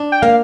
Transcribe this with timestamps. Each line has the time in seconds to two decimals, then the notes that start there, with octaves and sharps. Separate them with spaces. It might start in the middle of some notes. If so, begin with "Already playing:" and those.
Already playing: D4
0.12 G5
0.22 A#3 F5